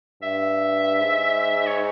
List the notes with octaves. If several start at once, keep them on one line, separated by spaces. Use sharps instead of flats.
G2 E5
G#2
C#5